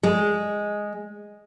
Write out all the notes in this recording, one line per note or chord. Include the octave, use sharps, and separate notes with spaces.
G#3